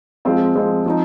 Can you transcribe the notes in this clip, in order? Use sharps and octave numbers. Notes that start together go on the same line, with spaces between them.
F3 G#3 C4 F4
F3 G#3 C4 F4
F3 C4 D#4